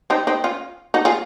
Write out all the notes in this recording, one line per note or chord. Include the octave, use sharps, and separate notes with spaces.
C4 D#4
C4 D#4
C#4 F4
D#4 F#4
F4 G#4